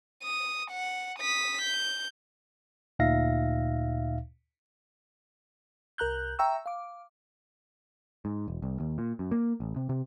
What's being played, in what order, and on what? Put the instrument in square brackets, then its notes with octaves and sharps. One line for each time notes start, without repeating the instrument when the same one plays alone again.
[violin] D#6
F#5
D#6 B6
G6
[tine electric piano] D2 A#2 D#4 E5 F5 A#6
[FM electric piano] C2 A#4 A#5 F#6 G6
E5 G5 A#5 C#6 E6
F5 D6
[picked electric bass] G#2
E1
C2
D#2
A#2
F#2
A#3
A1
C3
C3